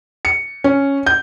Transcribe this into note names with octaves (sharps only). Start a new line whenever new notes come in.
C#7
C#4
G6